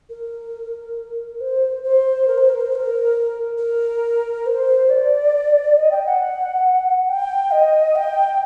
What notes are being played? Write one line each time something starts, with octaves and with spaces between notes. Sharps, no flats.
A#4
C5
C5
A#4
C5
A#4
C5
C5
A#4
A#4
C5
D5
D#5
G5
F#5
G5
D#5
G5